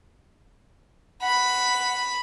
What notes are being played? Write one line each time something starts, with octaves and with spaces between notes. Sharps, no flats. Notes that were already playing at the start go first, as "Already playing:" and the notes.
F#5 B5